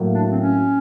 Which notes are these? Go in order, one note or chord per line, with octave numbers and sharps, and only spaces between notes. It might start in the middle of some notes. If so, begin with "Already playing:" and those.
Already playing: A2 F#3 A#3
D4
C4
C#4